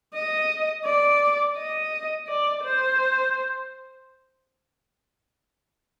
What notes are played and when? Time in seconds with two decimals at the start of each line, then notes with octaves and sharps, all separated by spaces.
0.14 D#5
0.85 D5
1.57 D#5
2.28 D5
2.64 C5